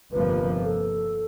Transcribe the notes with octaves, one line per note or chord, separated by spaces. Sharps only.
G1 F2 C3 F3 A#3 B4
A4